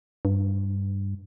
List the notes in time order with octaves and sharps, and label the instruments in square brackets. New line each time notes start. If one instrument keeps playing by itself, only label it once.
[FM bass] G2